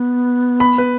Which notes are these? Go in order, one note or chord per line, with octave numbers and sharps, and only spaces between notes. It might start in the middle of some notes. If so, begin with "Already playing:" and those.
Already playing: B3
B5
B4